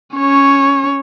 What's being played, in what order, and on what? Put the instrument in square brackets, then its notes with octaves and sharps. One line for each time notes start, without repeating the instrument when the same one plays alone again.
[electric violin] C#4 C#5